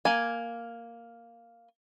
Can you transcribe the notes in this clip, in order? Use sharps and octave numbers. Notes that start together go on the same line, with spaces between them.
A#3 G#5